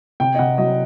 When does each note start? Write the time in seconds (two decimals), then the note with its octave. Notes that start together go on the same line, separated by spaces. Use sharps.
0.20 C3 G5
0.35 D#5
0.39 C3 F#5
0.58 F#3 D#5